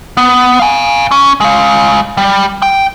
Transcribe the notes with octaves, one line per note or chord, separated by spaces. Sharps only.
B3
F5 G#5
C#4
G#3 F5
G3
G5